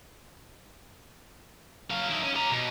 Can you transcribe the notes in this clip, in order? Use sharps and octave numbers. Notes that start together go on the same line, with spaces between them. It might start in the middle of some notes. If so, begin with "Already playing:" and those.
F#3 F5
D#4 E4
C#4
G4 A#5
B2